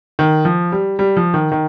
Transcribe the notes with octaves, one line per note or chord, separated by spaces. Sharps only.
D#3
F3
G3
G3
F3
D#3
D#3